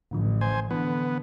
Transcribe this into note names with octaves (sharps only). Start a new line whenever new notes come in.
A1 A2 D3 F3
C5 G#5
D3 E3 B3